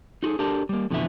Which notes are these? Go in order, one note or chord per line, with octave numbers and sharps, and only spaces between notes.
D#4 F#4 G#4 A4
D4 G4 A4 A#4 A5
G3 A#3
F2 B2 D3 E3 B3 E5